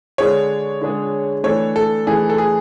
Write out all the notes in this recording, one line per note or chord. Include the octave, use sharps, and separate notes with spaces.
D3 G#3 D4 G#4 C#5
D3 G#3 D4 G#4
E3 A3 D4 A4 C#5
A4
E3 A3 D4 G#4 A4
A4
G#4